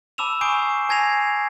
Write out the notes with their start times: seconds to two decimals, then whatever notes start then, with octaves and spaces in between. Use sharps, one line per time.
0.18 A5 B5 D6 E6 E7 F7
0.41 G#5 C#6 D#6 G6 C7 D7
0.89 G#5 A5 G#6 A#6 C7 F7